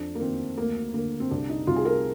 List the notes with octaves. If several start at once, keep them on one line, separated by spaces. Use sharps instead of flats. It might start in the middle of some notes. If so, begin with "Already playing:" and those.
Already playing: F2 D4
A#3
D#3 C4
D2 A#3
D3 A#3
C4
C2 D4
D#4
C2 F4
G#4
A#4